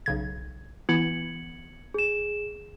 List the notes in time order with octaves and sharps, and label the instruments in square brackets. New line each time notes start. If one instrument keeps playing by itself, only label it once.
[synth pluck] B1 C#3 G#6
[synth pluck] E3 B3 E4 [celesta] G#6 C#7 F#7
[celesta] G#4 E7